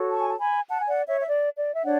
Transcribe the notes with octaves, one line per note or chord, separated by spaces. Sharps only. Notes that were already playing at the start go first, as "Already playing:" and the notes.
Already playing: F#4 A4 C#5
A5 C#6
G#5
A5
G#5 B5
F#5 A5
G#5
D5 F#5
C#5 E5
E5
D5
D5
E5
D4 C#5 D5 F#5